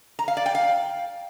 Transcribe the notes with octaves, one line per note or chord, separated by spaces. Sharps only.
A#5
F5
D5
G5
F5